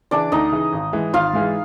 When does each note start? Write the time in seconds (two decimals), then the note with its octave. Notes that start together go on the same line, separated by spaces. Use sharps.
0.11 C#3 E3 D4 D5
0.32 D2 D#4 D#5
0.52 C#3 E3
0.73 G#1
0.93 G#2 E3 G#3
1.13 G#1 F4 F5
1.33 G#2 E3 G#3